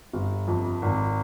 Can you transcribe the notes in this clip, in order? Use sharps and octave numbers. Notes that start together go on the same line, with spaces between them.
G1
F2
G#1